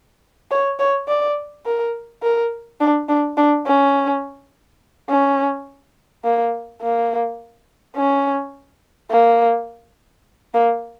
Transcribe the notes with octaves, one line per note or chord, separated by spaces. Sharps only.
C#5
C#5
D5
A#4
A#4
D4
D4
D4
C#4
C#4
A#3
A#3
C#4
A#3
A#3